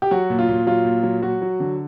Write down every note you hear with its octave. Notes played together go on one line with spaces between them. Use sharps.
G4
F#3 F#4
A#2
F4
A#2
F#3 F4
A#2
F#3
F#3 F#4
F#3
D3